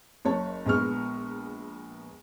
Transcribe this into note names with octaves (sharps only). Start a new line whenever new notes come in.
F#1 C#5 A5
A#1 G#3 B3 C#6 F6